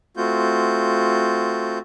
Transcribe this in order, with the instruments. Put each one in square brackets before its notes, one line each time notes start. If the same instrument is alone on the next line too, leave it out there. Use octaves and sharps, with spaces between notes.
[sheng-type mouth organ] A3 C4 F4 F#4 G6